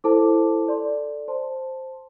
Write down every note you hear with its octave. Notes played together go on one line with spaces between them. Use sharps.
E4 A4 C5 A5 D6
A4 D5 C6
C5 A5 C6